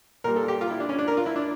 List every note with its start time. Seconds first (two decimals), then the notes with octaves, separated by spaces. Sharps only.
0.24 A#2 G3 A#4
0.36 A4
0.48 G4
0.61 F4
0.71 E4
0.80 D4
0.89 C#4
0.99 D4
1.08 A#4
1.17 F4
1.26 E4
1.36 D4